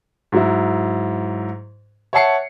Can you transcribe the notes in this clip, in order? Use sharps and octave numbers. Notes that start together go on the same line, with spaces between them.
G#2 F#3 E4
C#5 E5 F#5 A5 C7 C#7